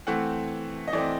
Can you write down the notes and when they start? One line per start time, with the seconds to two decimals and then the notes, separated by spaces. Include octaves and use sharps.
0.07 E3 A3 C4 F#5
0.88 D#5
0.93 E3 A3 C4 D5